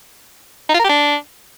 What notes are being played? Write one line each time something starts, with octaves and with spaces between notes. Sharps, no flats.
D#4
F4
A#4
G4
D4